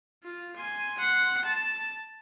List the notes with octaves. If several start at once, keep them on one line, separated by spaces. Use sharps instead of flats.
F4
G#5 C6
F#5 C6
A5